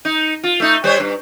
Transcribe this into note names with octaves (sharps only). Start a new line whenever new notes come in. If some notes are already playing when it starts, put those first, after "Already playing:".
D#4
F4
A3 D#4
G3 C5 C#5
G2